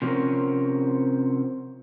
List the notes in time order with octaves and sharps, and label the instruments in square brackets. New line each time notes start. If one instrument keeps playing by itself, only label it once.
[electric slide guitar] C3 F3 F#3 C4 C#4 A#4